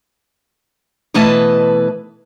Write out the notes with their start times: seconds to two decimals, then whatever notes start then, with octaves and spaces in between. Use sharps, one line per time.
1.14 B2 E3 A3 B4 D#5 A5